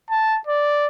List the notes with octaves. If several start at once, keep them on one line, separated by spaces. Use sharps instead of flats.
A5
D5